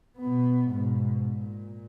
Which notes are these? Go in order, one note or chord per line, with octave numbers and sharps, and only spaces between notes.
B2 B3
G#2 B2
A#2